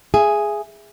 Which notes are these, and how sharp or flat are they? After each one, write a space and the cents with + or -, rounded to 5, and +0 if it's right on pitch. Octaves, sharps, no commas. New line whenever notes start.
G#4 +0 E5 +30